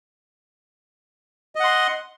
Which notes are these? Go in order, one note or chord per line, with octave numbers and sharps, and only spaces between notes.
D#5 F#5 C6